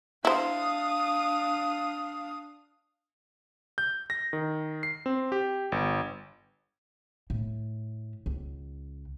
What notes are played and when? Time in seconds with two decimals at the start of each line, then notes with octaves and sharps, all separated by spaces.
0.25 D4 E4 C5 F5 D#6
3.78 G6
4.10 A#6
4.33 D#3
4.83 C7
5.06 C4
5.32 G4
5.72 G1
7.30 A2
8.26 C#2